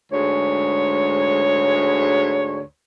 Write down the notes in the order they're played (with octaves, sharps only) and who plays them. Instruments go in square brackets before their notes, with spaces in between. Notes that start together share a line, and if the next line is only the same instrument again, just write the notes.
[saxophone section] D2 G#2 G#3 C#5